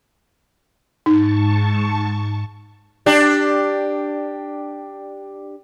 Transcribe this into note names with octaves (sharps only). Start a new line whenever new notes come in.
G#2 D#4 A5 C#6
D4 G4